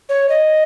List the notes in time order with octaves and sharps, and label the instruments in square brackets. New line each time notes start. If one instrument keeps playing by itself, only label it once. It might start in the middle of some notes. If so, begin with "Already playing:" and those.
[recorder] C#5
D#5